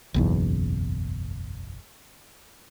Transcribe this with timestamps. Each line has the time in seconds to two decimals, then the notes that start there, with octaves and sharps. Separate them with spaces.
0.14 F#1 B1 E2